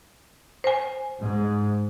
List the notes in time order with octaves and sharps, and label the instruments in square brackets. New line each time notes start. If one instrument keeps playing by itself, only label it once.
[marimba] C5 G#5
[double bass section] G#2